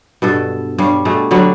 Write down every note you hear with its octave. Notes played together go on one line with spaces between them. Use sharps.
G2 B2 A4
G2 G3 C#5 F5
B2 G3 A3 G#4
D3 F#3 G3 B3